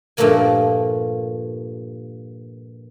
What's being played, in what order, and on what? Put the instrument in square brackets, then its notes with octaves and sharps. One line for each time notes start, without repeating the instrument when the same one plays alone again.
[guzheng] G2 A#2 F3 A3 A#3 G#5